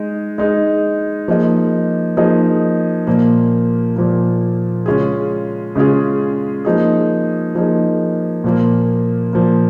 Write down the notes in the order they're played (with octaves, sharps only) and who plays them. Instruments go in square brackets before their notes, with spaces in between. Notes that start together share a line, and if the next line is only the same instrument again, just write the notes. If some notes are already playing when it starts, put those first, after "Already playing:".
Already playing: [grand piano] G#3 D#4 G#4
G#3 D#4 G#4
F3 A#3 D#4 G#4 D#5
F3 A#3 D#4 G#4 D#5
A#2 F3 A#3
A#2 F3 A#3
C#3 G#3 C#4 F4 G#4
C#3 G#3 C#4 F4 G#4
F3 A#3 D#4 G#4
F3 A#3 D#4 G#4
A#2 F3 A#3
A#2 F3 A#3